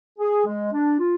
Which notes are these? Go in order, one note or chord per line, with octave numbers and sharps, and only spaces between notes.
G#4
G#3
D4
F4